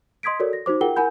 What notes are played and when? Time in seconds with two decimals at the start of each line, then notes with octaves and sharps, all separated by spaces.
0.23 D#5 C6 D#6 G#6 B6 D7
0.40 F#4 A4 A#4 C#5 D5
0.53 A#6
0.66 D#4 F#4 C5 D6
0.81 F4 G#4 A#4 F#5 G5 G7
0.96 E4 A#4 F#5 G#5 B5 G6